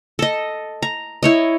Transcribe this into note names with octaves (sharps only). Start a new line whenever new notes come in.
A4 D#5
A#5
E4 C#5 D#5